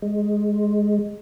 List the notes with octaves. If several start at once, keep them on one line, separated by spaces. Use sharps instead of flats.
G#3